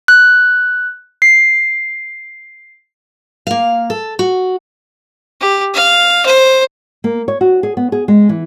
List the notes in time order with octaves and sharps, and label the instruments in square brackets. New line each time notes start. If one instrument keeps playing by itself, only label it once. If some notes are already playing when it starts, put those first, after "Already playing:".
[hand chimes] F#6
C7
[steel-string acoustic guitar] A#3 F5
A4
F#4
[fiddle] G4
F5
C5
[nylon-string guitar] A#3
C#5
F#4
G#4
B3
G#4
G#3
E3